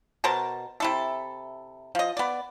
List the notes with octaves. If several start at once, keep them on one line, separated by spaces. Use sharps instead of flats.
B2 A#4 C5 A5
C3 E4 A4
F3 D#5
B3 D5